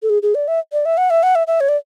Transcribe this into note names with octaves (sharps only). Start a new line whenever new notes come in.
A4
G#4
G#4
D5
E5
D5
E5
F#5
E5
F#5
E5
E5
C#5
D5